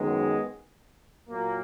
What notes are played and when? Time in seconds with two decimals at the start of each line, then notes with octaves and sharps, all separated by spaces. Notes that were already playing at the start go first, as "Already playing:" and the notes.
Already playing: F#2 D#3 G#3 B3
1.29 A#2 F#3 A#3